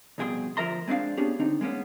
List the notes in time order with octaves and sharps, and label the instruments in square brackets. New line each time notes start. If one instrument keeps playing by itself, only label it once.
[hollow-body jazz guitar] C2 F2 B2 G#4 G5 C6
D2 F3 A#4 E5 A#5 C6
G#3 C4 D4 C#5 F5
B3 C#4 D4 G4 G#4 C#5
D3 C4 D4 D#4
G#3 A#3 B3 C#4